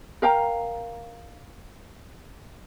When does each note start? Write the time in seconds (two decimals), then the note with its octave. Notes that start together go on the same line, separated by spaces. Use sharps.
0.22 A#4 F5 G5 A#5